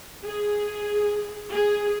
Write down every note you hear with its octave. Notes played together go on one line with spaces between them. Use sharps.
G#4
G#4